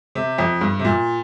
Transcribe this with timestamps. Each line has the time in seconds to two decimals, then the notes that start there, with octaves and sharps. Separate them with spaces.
0.15 C3
0.38 F2
0.61 G2
0.79 C3
0.85 A#2